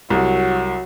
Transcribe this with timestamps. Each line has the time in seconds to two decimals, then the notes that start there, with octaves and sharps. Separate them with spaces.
0.10 C2 F#3